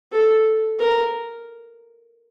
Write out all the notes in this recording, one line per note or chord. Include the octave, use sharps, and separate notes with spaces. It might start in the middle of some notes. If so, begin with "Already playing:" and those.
A4
A#4